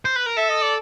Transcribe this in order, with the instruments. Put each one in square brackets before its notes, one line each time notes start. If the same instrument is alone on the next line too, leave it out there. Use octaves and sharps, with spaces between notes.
[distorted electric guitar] C5
B4
A#4
[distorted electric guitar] A4 [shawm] E5
[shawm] D#5
D5